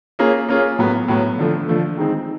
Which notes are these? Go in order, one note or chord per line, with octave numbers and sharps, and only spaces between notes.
A#3 C#4 F4 G#4
A#3 C#4 F4 G#4
A2 F#3 B3
A2 F#3 B3
D3 F3 A3
D3 F3 A3
D#3 G#3 C4 D#4